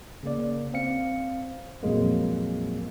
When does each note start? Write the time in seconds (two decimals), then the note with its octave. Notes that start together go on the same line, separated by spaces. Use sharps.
0.23 C#3 A#3 D5
0.74 C4 F5 C#7
1.83 F2 A#2 F#3 G#3 A#3